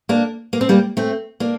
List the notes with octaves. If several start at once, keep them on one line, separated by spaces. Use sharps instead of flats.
A#3 D4
A#3
C4
G3 A#3
A3 C4
A#3 D4